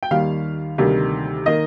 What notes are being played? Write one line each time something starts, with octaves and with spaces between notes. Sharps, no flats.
G5
D#2 D#3 G3 F5
D2 C3 D#3 G3 A#3
D#3 A#3 D#5